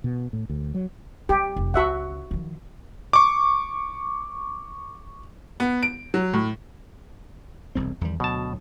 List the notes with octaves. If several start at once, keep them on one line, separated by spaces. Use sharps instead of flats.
B2
A2
D2
F#3
G3 G4
F1 F3
C#2 F#4 E5 F#5
D#3 F3
C#6 D6
B3
D7
F#3
A2
E1 C2 C4
E2 D#3 G3
D2 B2 F#3 A5